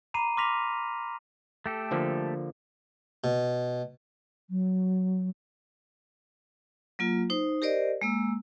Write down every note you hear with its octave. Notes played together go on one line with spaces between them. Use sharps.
A#5 B5 D6 C7 D#7
C6 D6 F6 A#6 B6 F7
A3 G4 A4
D3 F3 A#3
B2
F#3
F#3 A#3 F4
D#4 C5
G4 A#4 C5 D5 D#5
G#3 A#3 E6